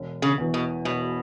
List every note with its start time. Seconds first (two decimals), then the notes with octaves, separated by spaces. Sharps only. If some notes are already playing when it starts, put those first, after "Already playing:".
Already playing: E1
0.22 C#3
0.38 E2 E3
0.54 B2
0.85 E1 B2